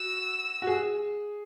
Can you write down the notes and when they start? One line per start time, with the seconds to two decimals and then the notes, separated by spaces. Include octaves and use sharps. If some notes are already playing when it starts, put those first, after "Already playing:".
Already playing: F#4 E6
0.62 F#4
0.67 G#4